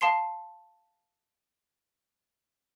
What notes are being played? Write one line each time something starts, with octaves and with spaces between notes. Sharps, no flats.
F5 A5 C6 C7